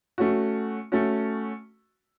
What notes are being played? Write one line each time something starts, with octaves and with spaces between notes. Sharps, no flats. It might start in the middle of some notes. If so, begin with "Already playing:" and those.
A3 C#4 F#4
A3 C#4 F#4